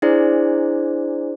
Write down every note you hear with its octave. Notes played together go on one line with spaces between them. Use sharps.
D4 E4 G#4 C5 D5